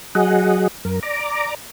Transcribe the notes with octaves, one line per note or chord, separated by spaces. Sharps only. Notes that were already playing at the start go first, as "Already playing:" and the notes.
F#3 G#4 D#5 F#5
F#2 A#4
D5 A#5 D6